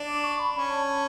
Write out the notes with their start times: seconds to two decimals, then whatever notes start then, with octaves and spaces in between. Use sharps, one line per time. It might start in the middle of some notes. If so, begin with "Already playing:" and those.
Already playing: D4
0.08 D6
0.24 C#6
0.39 B5
0.55 C#4 B5
0.70 A5